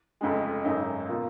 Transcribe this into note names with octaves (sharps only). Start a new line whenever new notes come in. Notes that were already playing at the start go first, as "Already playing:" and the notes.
F1 F2 C#3 G#3
G#1 F#2 C#3 G#3 D#4
B2 A#3 F4